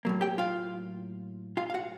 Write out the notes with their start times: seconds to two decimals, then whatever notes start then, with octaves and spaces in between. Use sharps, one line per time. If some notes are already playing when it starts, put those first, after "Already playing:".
0.05 A2 F#3 A#3
0.21 G4 G5
0.38 F4 F5
1.57 F4 F5
1.70 F5
1.74 F#4 F#5